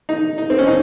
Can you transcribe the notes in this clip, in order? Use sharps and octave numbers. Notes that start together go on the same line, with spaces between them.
D#4
D#4
C4
C#4
D#4